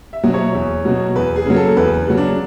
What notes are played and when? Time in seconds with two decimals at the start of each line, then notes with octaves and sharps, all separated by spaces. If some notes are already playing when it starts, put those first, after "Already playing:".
0.13 E5
0.24 B2 F#3
0.34 C#5
0.55 E2
0.85 B2 F#3
1.15 E2 B4
1.36 G#4
1.46 C#3 F#3
1.56 A4
1.77 E2 B4
2.07 C#3 F#3
2.17 D4